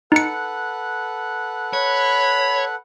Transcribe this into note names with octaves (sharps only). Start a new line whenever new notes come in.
D#4 A4 B4 F#5 C#7
C#5 B5